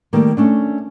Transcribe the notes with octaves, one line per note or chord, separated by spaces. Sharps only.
D#3 G3 A3 A#3
A3 C#4 D4